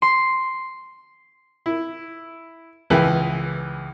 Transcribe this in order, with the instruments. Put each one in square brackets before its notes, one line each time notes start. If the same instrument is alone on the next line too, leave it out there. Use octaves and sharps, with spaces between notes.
[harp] C6
[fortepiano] E4
C#2 E3 G#4 B4 E5 G5